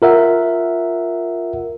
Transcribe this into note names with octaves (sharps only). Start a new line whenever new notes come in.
F4 A#4 E5 F#5